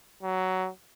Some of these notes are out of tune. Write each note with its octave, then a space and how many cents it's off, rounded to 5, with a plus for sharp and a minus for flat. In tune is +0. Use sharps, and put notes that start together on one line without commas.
F#3 +10